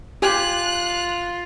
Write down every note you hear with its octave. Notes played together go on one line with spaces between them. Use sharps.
F4 G4 G#5 F#6